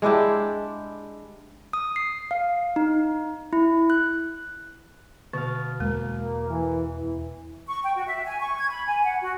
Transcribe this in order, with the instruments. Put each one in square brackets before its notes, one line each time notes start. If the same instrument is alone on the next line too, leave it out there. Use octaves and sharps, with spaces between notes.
[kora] G#3 D4 E4 G4
[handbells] D#6
C7
F5
D#4
E4
F#6
[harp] B2 F5 [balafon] D3
[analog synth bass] E2 [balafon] G#3 [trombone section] A#3
[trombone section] E3
E3
[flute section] C#6
G5
F#4
E5
G#5
C#6
G#6
B5
G#5
F#5
F#4